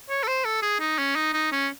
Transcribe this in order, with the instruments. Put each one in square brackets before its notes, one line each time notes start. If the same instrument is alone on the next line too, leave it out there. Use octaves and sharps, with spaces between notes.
[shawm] C#5
A4
C5
A4
G#4
D#4
C#4
D#4
D#4
C#4